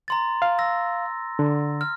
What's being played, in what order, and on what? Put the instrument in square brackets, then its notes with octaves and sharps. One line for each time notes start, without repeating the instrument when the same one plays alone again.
[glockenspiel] A#5 C6 A6
[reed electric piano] F5
[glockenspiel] E6 A#6
[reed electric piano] D3
[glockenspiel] F6